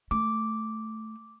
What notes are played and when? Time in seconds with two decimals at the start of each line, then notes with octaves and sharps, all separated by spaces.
0.11 A3 D6